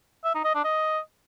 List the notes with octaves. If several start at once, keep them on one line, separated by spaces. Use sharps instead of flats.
E5
D#4
D#5
D4
D#5